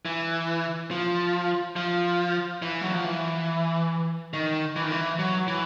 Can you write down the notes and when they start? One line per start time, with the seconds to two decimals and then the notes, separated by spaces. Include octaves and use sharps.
0.05 E3
0.91 F3
1.76 F3
2.62 E3
2.81 F#3
2.93 F3
3.05 E3
4.33 D#3
4.76 E3
4.84 D#3
4.92 E3
5.19 F#3
5.48 E3